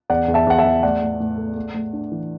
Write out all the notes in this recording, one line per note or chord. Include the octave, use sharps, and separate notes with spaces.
E2 D5 F#5
E2
E5 A5
E2 F#5
E5 A5
E2
A2 D5 F#5
A2
A2
A3
A3
A2
D4
E3